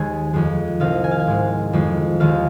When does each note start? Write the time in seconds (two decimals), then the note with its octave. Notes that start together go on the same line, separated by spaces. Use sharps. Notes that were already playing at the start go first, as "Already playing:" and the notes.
Already playing: D#2 D#3 G#3 G#5
0.33 F2 D#3 G#3
0.80 C2 C3 D#3 F5
1.04 G#5
1.11 F5
1.20 G#5
1.27 G#2 D#3 G#3
1.73 F2 D#3 G#3
2.20 D#2 D#3 G#3 F5